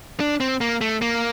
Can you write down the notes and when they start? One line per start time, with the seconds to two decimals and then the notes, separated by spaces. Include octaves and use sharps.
0.20 D4
0.40 C4
0.61 A#3
0.81 A3
1.02 A#3